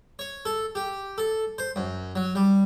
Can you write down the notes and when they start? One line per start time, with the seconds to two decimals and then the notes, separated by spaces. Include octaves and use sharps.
0.19 C#5
0.45 A4
0.75 G4
1.18 A4
1.58 C5
1.76 F#2
2.16 F#3
2.35 G3